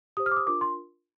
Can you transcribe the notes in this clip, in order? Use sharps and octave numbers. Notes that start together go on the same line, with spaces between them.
G4 C5 D#6
F6
D6
D#6
D4 F4 A#4 D6
C6